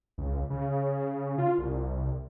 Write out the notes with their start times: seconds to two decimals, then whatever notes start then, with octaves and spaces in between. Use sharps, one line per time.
0.18 C#2
0.50 C#3
1.38 F4
1.58 C2